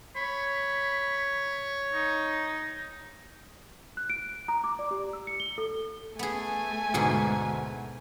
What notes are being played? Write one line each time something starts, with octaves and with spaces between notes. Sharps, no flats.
C#5 B5
D#4
F#6
D7
A#5
D6
D5
G4
E6
C#7
G7
A4
A3 B3 G#4 G#5
D2 G#2 B2 G#4 F#5